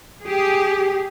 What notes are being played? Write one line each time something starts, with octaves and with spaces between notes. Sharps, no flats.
G4 G#4